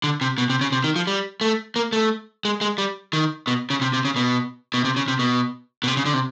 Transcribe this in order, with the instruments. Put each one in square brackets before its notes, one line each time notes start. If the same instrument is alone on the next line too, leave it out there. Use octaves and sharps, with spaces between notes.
[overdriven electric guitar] D3
C3
B2
C3
C#3
C3
D#3
F3
G3
A3
A#3
A3
G#3
G#3
G3
D#3
B2
C#3
C3
C3
C#3
B2
B2
C3
C#3
C3
B2
B2
C3
C#3
D3
C3